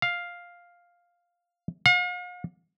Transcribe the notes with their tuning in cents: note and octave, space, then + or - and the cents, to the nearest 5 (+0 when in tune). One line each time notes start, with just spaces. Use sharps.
F5 +5
F5 +45